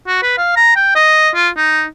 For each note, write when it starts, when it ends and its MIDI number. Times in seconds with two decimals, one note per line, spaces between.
0.07 0.19 66
0.22 0.35 71
0.37 0.52 77
0.56 0.74 82
0.76 0.95 79
0.95 1.30 75
1.35 1.49 65
1.57 1.85 63